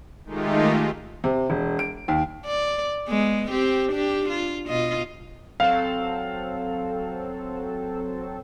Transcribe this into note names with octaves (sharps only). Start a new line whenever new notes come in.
D#3 G#3 A3 D#4 F4 G4
C3
E1
D7
D#2
D5
G#3 B3
C4 G4
D4 G4
F4
B2 F4 D#5
F#3 C4 A4 F5